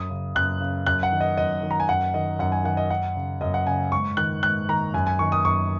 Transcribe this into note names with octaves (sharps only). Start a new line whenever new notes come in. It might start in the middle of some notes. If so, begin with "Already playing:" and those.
Already playing: F#2 D#6
C#3
F#2 F#6
C#3
F#2 F#6
F#5
D#3
D#5
F#2 D#5
D#3
A#5
G#5
F#2 F#5
D#3 D#5
F#2 F#5
G#5
D#3 F#5
D#5
F#2 F#5
C#3
F#2 D#5
F#5
C#3 G#5
G#2 C#6
D#3 F#6
G#2 F#6
D#3 A#5
F#2 G#5
G#5
D#3 C#6
D#6
F#2 C#6